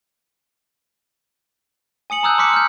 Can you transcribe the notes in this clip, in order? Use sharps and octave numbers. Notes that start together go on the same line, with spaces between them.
G#5 D#6 C#7 F#7
A5 A#5 D#6 E6 F#6 G6
A5 C6 D6 F6 B6 C#7
F6 G6